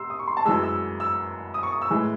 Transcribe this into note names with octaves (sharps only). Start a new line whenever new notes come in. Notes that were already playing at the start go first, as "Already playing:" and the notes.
Already playing: C3 C6 E6
D#6
C#6
C6
A5
F#2 E3 G#3 E6
E6
E6
D#6
C#6
D#6
E6
A2 E3 G#3